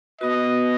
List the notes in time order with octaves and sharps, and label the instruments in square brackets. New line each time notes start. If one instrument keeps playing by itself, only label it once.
[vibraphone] B3 F#4 B4 [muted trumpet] D#5